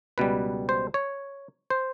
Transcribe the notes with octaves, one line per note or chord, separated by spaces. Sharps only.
C#2 B2 G3 B4
C5
C#5
C5